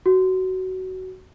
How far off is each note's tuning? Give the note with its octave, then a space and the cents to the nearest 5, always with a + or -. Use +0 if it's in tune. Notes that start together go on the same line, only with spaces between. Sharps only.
F#4 +15